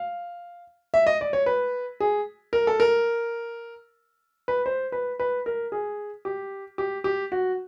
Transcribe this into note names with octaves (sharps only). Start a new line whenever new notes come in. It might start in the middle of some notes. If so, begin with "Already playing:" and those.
Already playing: F5
E5
D#5
D5
C#5
B4
G#4
A#4
A4
A#4
B4
C5
B4
B4
A#4
G#4
G4
G4
G4
F#4